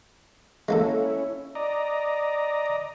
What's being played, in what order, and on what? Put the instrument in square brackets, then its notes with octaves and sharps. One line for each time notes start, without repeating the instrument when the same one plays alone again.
[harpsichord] G#3 A#3 A4 [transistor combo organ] C#4 E4
[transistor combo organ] D5 D#5 A#5